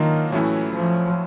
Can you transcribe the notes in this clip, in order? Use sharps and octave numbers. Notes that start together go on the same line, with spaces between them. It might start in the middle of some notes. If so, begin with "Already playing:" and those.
Already playing: D#3 F#3 A#3 D4 F4
A2 E3 F#3 A3 C#4 E4
F3